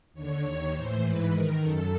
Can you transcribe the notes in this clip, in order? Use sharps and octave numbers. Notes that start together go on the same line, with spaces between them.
D#2 D3 C#5
D#2 D#3
A2 E3 C5
G#2 E3 B4
G#2 D#3 A#4
F#2 D#3 A4